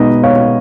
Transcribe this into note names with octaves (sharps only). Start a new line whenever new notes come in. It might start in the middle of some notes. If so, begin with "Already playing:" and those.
Already playing: B2 G#3 B3 D#4 B4 D#5
C#5 F5